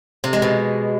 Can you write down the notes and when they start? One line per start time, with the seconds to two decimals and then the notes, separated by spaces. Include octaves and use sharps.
0.24 C3
0.33 G#3
0.42 B2